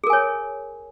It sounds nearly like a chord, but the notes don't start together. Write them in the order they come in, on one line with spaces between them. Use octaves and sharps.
G#4 A#4 G#5 C#5